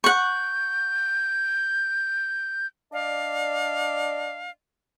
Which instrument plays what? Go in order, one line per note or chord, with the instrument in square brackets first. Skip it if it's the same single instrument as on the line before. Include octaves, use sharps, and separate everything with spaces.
[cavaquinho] F#5 C#6 [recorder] G6
[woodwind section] D4 D5 D#5 F5